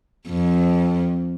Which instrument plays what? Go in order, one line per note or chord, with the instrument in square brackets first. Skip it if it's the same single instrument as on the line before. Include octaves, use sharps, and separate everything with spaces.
[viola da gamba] F2